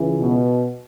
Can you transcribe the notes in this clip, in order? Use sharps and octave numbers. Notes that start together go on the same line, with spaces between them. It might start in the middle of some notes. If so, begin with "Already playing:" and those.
Already playing: C#2 C#3 E3
B2